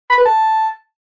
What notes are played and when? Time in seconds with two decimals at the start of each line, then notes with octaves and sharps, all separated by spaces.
0.10 B5
0.17 B4
0.25 A5